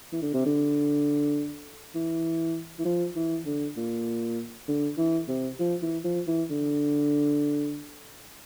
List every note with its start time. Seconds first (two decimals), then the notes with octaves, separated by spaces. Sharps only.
0.13 E3
0.23 D3
0.34 C3
0.46 D3
1.95 E3
2.79 E3
2.85 F3
3.16 E3
3.46 D3
3.77 A#2
4.68 D3
4.98 E3
5.28 C3
5.60 F3
5.82 E3
6.04 F3
6.27 E3
6.50 D3